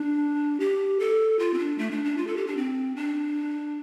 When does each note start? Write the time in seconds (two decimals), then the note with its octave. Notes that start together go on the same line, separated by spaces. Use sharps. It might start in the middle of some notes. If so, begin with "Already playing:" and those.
Already playing: D4
0.60 G4
1.00 A4
1.39 F4
1.54 C4
1.58 D4
1.78 A3
1.91 D4
2.04 D4
2.17 F4
2.27 A4
2.37 G4
2.47 D4
2.57 C4
2.96 D4